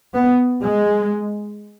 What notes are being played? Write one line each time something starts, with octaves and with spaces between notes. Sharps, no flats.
B3
G#3